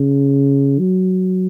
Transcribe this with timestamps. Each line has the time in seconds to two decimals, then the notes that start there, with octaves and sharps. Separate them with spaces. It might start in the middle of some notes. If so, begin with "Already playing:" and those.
Already playing: C#3
0.79 F#3